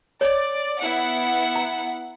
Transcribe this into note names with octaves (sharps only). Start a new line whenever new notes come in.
C#5 D5
B3 E4 F#5
A#5